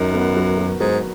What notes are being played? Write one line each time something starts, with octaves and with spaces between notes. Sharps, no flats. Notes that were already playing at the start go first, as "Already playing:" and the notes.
Already playing: F#2 D#3
B3
F#3
F#3
G#2 F#3